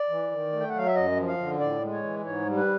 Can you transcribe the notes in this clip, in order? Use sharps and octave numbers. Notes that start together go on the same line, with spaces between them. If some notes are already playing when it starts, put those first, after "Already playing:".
Already playing: D5
E3
D#3
A3
G5
F#5
F#3 F5
E5
F#2 D#5
F3
F5
D3
A2 D5
G#3
C#5
E3
G#2 C#5
G3
B4